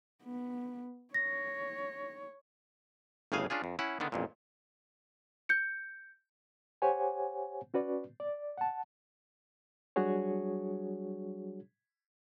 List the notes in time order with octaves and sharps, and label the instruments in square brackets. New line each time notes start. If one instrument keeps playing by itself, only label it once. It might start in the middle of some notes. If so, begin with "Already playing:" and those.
[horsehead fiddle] B3
[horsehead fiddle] C#5 [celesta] A#6
[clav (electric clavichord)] G1 A2 C#3 G#4 F5 G#5
C#4 D4 F4 G#4
F2
C#4 E4 F#5
D3 D#3 B3 D4
A1 F2 A#2
[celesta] G6 C#7
[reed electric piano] G4 C5 C#5 F#5 G#5
C#4 F#4 B4 D5
D5
F#5 A5
F#3 G3 D4 F#4 G#4 C#5